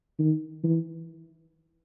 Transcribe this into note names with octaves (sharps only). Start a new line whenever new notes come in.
D#3
E3